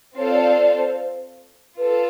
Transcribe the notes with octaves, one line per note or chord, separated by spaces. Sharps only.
C4 F4 A4 C5 C#5 F5
D5
D5
D5
C5
F4 A4 B4